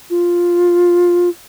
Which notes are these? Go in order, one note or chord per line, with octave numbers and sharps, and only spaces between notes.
F4